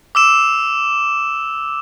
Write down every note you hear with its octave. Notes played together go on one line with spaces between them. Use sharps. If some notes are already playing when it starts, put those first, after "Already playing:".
D6 E6 E7